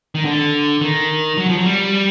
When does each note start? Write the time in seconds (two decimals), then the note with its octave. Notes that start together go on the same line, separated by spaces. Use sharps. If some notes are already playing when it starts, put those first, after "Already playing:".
0.15 D#3
0.25 D3
0.81 D#3
1.37 F#3
1.49 F3
1.57 F#3
1.66 G3